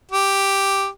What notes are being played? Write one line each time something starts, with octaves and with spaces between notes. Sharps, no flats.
G4